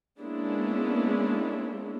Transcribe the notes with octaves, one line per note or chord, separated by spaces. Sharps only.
G#3 A#3 B3 C#4 D4 E4